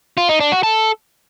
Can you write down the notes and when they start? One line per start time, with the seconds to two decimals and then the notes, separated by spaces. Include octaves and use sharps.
0.18 F4
0.29 D#4
0.40 D4
0.52 F#4
0.63 A4